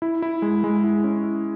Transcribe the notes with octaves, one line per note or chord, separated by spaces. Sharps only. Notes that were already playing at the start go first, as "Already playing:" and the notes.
E4
E4
G#3
G#3
E4
C#4
E4